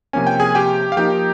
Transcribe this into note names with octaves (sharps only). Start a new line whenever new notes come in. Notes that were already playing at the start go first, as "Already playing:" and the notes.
C3 F3 A#3 C#4 G#5
G5
G#4 G#5
G4 G5
F5
F3 A#3 D#4 G4 G5